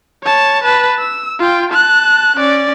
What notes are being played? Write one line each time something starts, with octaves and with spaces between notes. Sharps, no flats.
C#5 A5
B4 A5
E6
F4 G5
A5 F#6
C#4 D5